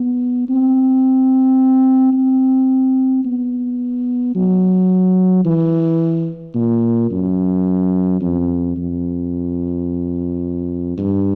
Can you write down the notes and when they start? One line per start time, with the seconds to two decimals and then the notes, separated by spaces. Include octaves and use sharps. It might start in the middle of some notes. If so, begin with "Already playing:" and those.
Already playing: B3
0.49 C4
2.13 C4
3.25 B3
4.35 F#3
5.45 E3
6.55 A#2
7.11 F#2
8.21 F2
8.77 F2
10.97 G2